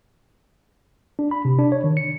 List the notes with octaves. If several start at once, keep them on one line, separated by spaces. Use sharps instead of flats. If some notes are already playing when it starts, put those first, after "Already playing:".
D4
B5
C3
D4
C#5
D#3
C#7